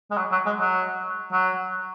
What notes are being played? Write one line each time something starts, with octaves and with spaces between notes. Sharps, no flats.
G#3
F#3
F#3
G#3
F#3
F#3